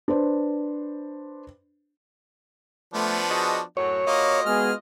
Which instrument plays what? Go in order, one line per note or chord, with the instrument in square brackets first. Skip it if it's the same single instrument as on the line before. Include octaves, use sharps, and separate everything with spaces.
[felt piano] D4 B4 C5
[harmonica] F3 B3 D4 [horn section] A3
[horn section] F#4 G#4 D#5
[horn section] F#2 A2 F#3 [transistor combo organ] C#5
[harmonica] A#3 [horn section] F4 F#4 D#5
[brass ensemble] G#3 B3 G#4 [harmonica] F6